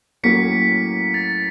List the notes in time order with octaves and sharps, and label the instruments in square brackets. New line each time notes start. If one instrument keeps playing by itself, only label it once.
[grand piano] A2 F#3 A#3 C#4 [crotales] B6 C#7
[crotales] A6